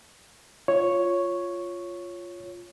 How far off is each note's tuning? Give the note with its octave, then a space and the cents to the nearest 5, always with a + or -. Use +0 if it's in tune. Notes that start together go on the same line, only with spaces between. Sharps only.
F4 +0 C#5 +0